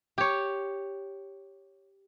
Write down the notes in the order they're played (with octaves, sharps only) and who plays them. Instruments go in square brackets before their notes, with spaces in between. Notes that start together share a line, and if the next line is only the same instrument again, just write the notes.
[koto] G4 C#5